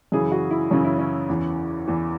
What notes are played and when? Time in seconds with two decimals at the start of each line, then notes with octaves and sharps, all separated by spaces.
0.12 F#2 C#3 E3 G#4
0.32 F#4
0.51 E4
0.70 F#2 C#3 E3 C#4
0.85 E4
0.99 C#4
1.29 E2 E3
1.88 E2 E3